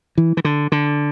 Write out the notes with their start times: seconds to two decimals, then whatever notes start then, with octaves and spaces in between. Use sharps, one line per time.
0.18 E3
0.37 E3
0.45 D3
0.72 D3